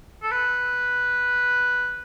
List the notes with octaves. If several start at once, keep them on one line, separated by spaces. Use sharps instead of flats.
A4
B4